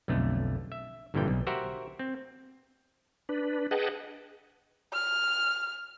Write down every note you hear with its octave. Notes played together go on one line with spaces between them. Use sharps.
B1 F2 D3 A3
E5
G1 G2 A#2 D3 E3 G5
B1
F#4 G4 A#4 C5 E5 F#5
C4
D4 B4
G#4 B4 D#5 F#5 G5 A5
F6